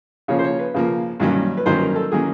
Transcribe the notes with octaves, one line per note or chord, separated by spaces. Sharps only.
C#3 F3 A#3 C#5
C5
C#5
B4
C#3 F3 A#3
G2 D#3 F#3 A#3 C#4
B4
G2 D#3 F#3 A#3 C#4 C5
B4
A#4
A4
D#3 F#3 A#3 C#4 G#4